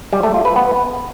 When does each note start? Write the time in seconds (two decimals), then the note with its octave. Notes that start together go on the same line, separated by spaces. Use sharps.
0.13 G3
0.23 A3
0.34 F4
0.45 B4
0.56 B3